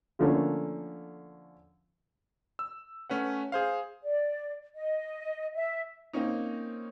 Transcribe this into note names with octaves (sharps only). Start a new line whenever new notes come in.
D3 F3 A3 A#3 C#4
E6
A3 C#4 B4 F#5
G#4 C5 F5
D5
D#5
E5
A#3 C4 C#4 D#4